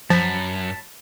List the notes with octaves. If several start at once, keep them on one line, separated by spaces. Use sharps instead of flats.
F#2 F3 A5 B5